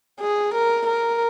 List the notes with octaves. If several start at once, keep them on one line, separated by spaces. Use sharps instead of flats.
G#4
A#4
A#4